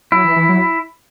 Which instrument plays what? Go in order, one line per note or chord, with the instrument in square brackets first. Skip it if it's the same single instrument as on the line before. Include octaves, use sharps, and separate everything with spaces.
[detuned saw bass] F#3 [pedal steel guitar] E4
[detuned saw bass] E3
E3
F#3